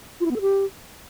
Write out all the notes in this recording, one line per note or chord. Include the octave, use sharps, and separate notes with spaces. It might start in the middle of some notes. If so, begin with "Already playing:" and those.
F4
E4
B3
A4
G4